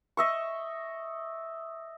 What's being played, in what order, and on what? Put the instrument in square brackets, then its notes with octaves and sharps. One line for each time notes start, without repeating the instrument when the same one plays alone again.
[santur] D#5 E5 C#6